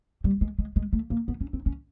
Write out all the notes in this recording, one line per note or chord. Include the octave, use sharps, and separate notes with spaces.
G3
G#3
G#3
G#3
A3
A#3
B3
C#4
C4
C#4